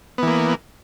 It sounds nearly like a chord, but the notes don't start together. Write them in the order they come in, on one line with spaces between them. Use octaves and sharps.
B3 E3 A#3